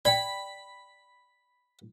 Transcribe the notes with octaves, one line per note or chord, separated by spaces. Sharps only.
D5 G5 B5